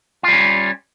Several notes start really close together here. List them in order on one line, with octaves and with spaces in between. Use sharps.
F4 G3 C#4